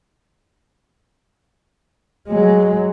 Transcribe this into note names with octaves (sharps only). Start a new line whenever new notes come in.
F#3 G#3